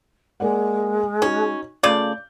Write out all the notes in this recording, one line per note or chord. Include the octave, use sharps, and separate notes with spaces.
G#3 A#3 D5 F#5
C#4 D#4 F#4
C#3 A3 F4 D5 G6